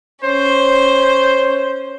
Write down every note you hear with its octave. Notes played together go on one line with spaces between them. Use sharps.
C#4 C5